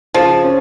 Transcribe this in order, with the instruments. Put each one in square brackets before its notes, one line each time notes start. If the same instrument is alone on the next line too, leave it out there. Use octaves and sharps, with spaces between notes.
[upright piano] C#3 [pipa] F3
[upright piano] C#4